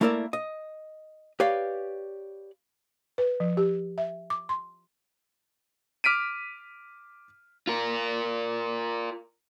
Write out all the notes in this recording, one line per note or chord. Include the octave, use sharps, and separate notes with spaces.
A3 A#3 E4 A#4 D5 E5
D#5
G4 B4 C#5 D5 F5
B4
F3
G4
E5
D6
C6
D6 F6 B6 D7 D#7
F4 A#4